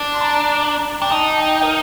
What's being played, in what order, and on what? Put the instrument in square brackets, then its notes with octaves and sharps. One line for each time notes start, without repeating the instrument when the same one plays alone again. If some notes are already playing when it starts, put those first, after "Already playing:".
Already playing: [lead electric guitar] D4
[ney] C6
A#5
[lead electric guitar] D4 [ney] G5
[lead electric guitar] D#4 [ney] A5
[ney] A5
G5
A#4